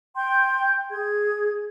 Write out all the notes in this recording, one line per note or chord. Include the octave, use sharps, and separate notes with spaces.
G5 C6 G6
G#4 G#6